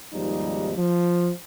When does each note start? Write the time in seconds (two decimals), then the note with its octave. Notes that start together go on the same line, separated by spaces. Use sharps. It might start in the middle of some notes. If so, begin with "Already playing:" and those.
0.14 G#1 D#2 F3 G3 D#4
0.77 F3